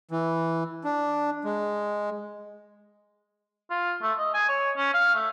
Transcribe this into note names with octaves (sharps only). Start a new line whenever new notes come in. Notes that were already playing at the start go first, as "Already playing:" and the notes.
E3
D4
G#3
F4
A3
D#5
G#5
C#5
C#4
F5
A3